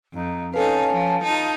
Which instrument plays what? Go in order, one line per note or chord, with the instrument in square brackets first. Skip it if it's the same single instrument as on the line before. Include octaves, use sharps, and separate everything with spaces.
[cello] F2 [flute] D#4
[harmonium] C#4 [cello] D#4 F5 [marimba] A4 B4 [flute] A5
[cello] F3 [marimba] F5
[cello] D#4 F4